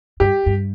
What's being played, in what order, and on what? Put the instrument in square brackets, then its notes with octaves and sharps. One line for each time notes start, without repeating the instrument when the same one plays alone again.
[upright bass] G2 [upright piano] G4
[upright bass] G2